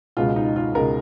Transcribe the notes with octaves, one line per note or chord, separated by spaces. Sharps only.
C#2 B2 G#3 F4
D#4
F4
C#2 B2 G#3 A#4